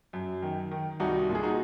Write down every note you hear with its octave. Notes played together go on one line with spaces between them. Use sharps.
F#2
D#3
D#3
C2 D#4 F#4
A#2
G#4
D#4 F#4